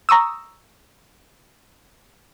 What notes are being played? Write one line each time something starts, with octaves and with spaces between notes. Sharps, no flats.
A#5 C#6 D#6 E6